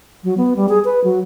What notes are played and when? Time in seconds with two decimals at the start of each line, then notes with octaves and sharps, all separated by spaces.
0.24 F#3
0.37 B3
0.56 G3
0.69 G#4
0.85 B4
1.04 F#3